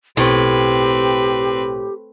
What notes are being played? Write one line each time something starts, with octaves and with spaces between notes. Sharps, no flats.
B1 A2 C4 G4 B4